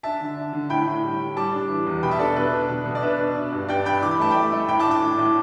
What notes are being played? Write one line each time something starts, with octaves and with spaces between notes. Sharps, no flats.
D4 E5 A5
D3
D4
D3
A2 G5 B5
A2
G3
A2
G3 A5 D6
D4
E3
E2
B2 G5 B5
E5 A5
D4 A4 D5
B2 B4
D4
B2
B2
D5
D4 B4 E5
D4
D4
G2
G2 D5 G5
D4 G5 B5
E3 D6
B5
A3 A5
A3 G5 B5
A3
A2 G5 B5
A5 D6
D4
A5 D6
A2
A2